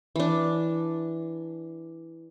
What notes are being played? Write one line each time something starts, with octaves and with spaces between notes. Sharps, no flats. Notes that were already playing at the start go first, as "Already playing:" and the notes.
E3 D4